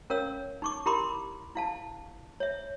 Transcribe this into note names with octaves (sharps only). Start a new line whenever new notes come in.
C#4 A#4 C#5 F5 E6
D#4 C#6 D6
E4 G4 A#4 B5 C6 D6
E4 F5 A5
C#5 E5